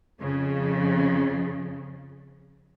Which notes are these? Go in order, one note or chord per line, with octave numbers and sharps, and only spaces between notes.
F2 C#3